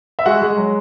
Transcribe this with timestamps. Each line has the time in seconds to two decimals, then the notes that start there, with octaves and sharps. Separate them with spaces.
0.19 E5
0.26 G#3 F#4 F#5
0.42 G#3
0.57 F#3